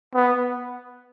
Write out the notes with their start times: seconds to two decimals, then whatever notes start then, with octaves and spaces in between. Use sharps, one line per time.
0.15 B3